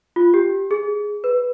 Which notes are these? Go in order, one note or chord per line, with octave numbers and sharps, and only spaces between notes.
F4
G4
G#4
B4